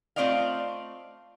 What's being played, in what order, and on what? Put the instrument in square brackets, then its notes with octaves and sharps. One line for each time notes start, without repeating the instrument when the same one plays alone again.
[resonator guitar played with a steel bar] A3 C4 F4 D5 D#5 F5